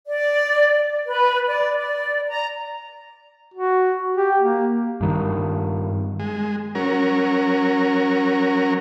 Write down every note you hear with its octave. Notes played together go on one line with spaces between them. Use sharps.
D5
B4
D5
D5
A#5
F#4
G4
A#3
G2 D#3
G#3
F#3 C#4 A#4